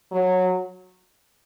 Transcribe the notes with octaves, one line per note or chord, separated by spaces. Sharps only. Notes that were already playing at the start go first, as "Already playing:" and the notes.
F#3